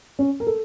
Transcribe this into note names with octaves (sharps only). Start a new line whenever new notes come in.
C#4
A#4
A4